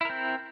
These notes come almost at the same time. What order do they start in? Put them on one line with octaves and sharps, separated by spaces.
E4 A#4 C4